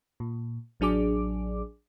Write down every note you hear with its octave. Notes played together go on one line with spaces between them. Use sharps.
A#2
A1 F#3 D4 G#4 D6